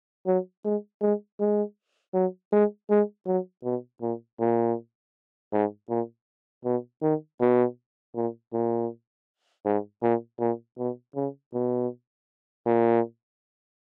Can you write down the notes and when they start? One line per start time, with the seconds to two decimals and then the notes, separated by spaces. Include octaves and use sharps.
0.26 F#3
0.64 G#3
1.01 G#3
1.40 G#3
2.14 F#3
2.52 G#3
2.90 G#3
3.26 F#3
3.64 B2
4.02 A#2
4.40 A#2
5.53 G#2
5.89 A#2
6.65 B2
7.02 D#3
7.41 B2
8.15 A#2
8.53 A#2
9.66 G#2
10.02 A#2
10.40 A#2
10.78 B2
11.15 C#3
11.54 B2
12.66 A#2